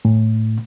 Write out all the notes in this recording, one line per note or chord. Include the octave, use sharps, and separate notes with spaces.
A2